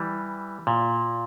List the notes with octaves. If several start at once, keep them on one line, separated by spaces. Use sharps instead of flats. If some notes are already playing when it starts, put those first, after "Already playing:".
Already playing: E3 G3
A#2